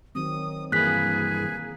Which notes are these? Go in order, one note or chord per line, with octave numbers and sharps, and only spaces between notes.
D#3 F#3 C4 D#6
G2 E3 A#3 G#4 B4 F#6 B6